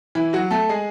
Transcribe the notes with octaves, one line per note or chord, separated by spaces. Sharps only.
E3 E4
F#3 F#4
A3 A4
G#3 G#4